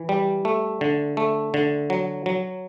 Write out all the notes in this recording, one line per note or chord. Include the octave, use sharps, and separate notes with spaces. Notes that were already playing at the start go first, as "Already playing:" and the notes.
Already playing: E3
G3
A3
D3
A3
D3
F#3
F#3